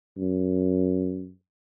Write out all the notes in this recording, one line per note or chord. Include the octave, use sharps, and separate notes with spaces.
F#2